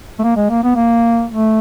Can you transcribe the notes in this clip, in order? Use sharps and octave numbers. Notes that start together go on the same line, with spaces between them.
A3
A#3
G#3
A#3
B3
A#3
A3